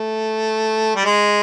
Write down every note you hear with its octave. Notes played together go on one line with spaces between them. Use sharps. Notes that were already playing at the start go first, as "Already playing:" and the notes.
Already playing: A3
G3
G#3